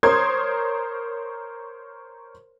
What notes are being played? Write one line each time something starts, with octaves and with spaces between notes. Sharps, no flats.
A#4 C5 C#5 C6 D#6 G#6